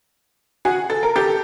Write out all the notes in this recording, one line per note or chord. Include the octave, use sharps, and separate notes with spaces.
F#4 G#4
A4
A#4
G4 A4